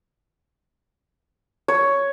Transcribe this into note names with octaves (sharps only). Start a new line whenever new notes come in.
C#5